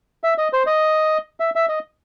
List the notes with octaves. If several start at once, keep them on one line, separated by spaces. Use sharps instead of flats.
E5
D#5
C5
D#5
E5
E5
D#5